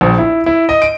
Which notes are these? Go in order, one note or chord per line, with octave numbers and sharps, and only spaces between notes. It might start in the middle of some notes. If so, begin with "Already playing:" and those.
A#1
E4
E4
D#5
D7